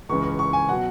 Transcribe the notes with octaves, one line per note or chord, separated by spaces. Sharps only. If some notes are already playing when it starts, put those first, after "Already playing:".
C#2 C#3 E3 G#3 C#4 C#6
C#6
C#6
G#5
B2 F#3 F#5